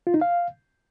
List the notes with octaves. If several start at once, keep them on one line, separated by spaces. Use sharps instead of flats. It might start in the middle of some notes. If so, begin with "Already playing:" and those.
F4
D#4
F5